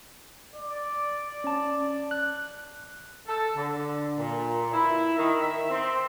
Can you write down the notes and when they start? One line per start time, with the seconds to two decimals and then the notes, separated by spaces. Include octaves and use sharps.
0.55 D5
1.44 C#4 A5
2.11 F#6
3.27 A4
3.56 D3
4.17 A#2
4.74 E4
5.17 D#3
5.40 E5
5.70 C4